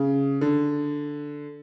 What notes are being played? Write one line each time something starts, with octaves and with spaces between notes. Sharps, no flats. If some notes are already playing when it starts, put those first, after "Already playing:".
Already playing: C#3
D3